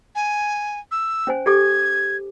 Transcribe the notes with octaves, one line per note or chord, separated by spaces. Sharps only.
G#5
E6
C#4 C5 G#5
G4 A4 D6 G#6